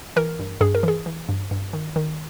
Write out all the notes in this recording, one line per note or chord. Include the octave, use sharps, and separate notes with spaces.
E3 A#4
G2
G2 G#4
A#4
E3 G#4
E3
G2
G2
D#3
D#3